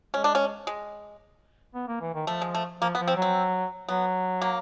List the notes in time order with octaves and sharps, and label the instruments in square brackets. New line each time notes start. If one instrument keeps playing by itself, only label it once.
[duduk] G#3 [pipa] C#4
[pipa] D4
C#4
G#3
[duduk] B3
A#3
E3
D#3
[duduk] F3 [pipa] A3
[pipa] G#3
A3
[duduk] F3 [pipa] A#3
[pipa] B3
[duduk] F3
[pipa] C4
[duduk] F#3
[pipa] C4
[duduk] F#3 [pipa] B3
[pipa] A#3